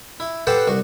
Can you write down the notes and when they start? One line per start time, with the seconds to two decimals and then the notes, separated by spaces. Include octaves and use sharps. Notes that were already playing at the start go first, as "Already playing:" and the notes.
0.20 E4
0.47 G4 A4 B4 C5 F#5 A5
0.68 C2 F#4